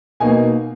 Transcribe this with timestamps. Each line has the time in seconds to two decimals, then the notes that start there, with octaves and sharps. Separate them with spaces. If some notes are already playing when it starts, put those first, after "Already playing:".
0.20 B2 A#3 D#4 G#5